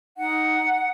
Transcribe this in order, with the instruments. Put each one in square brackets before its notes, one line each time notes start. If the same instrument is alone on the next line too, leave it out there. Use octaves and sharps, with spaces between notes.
[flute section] D#4 F#5